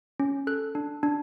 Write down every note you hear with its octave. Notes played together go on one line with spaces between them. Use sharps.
C#4
A4 F#6
D4
D4